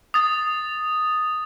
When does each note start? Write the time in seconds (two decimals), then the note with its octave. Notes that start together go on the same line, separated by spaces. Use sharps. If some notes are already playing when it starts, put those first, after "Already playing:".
0.14 D#6 A6